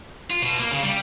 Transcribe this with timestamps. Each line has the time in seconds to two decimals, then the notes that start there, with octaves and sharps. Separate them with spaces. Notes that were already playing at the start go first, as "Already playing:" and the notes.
0.30 F4
0.42 B2
0.59 A#3
0.71 C#3
0.83 G3